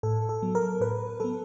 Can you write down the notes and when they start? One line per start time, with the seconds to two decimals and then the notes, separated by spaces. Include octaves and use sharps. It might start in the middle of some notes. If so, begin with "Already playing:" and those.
0.03 A2 A4
0.29 A4
0.42 F#3 B3
0.55 A#4
0.80 A2 B4
1.20 F#3 B3 A4